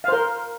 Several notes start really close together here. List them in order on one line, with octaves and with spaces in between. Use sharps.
F5 C5 A#4